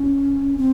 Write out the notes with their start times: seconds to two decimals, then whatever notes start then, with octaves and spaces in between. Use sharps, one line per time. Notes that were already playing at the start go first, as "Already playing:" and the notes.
Already playing: C#4
0.58 C4